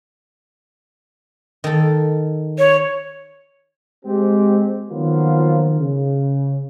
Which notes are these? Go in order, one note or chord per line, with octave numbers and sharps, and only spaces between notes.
D#3 A4
C#5
G#3 C4 G4
D#3 F3 F#3 A#3 B3 F4
C#3